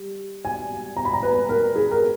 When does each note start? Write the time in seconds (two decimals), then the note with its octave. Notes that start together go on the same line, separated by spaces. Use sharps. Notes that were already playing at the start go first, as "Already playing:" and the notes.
Already playing: G3
0.45 G#5
0.97 A#5
1.05 B5
1.13 A#5
1.23 B4
1.49 A#4
1.76 G#4
1.92 A#4